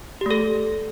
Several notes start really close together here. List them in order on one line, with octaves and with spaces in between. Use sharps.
G4 A3 A4